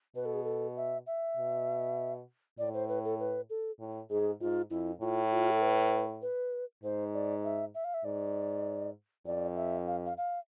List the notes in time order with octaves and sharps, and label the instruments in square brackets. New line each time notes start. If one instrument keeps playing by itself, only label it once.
[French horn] B2 [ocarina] B4
[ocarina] A4
G#4
A4
E5
E5
[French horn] B2
[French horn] A2 [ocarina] D5
[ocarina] C5
B4
A4
B4
A4
[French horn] A2
[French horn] G#2 [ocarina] G#4
[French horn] G#2 [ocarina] F4
[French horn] F2 [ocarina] E4
[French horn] A2 [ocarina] F4
[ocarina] F4
A4
B4
B4
[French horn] G#2 [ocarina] C5
[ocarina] D5
E5
E5
F5
E5
[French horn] G#2 [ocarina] D5
[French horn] F2 [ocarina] D5
[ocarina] E5
F5
F5
F5